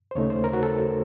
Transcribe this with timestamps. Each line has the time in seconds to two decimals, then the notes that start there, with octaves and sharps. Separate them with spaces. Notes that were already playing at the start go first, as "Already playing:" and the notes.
0.11 C5
0.15 D#2 C#3 A3 D#4 C#5
0.30 C5
0.44 A#4
0.53 F#4
0.63 A4